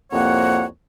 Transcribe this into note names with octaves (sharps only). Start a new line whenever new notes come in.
C2 F2 A#3 C#5 F#5